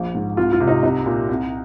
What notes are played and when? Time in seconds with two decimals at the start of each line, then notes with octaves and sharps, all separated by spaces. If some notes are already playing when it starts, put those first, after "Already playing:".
Already playing: A#1
0.14 G#2
0.37 C2 F4
0.53 F4
0.60 C3
0.68 D#4
0.83 C2 D#4
1.06 A#2
1.29 C2